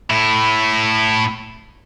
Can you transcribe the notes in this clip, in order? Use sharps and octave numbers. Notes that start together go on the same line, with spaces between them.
A2 E4